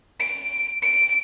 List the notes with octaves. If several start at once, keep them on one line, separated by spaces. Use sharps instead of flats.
D7
D7